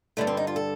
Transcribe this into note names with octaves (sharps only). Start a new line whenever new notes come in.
G2 D3 G3 A3
C4
D#4
F4
A4